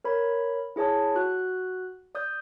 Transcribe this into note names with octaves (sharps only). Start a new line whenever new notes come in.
A#4 C#5 B5
E4 G#4 C#5 A5 D#6
F#4 F#6
D5 D#6 G6